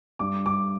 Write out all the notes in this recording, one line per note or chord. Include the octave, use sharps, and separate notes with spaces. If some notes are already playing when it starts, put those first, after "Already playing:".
G2 D6
G2 D6